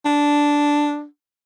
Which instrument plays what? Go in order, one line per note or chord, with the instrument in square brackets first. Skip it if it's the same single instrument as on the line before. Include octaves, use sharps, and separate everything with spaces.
[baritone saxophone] D4